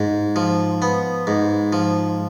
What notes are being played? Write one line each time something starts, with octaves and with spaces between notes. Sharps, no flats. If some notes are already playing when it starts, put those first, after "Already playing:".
Already playing: G#2
F3
B3
G#2
F3